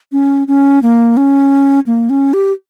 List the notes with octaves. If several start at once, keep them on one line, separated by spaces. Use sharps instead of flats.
C#4
C#4
A#3
C#4
A#3
C#4
G4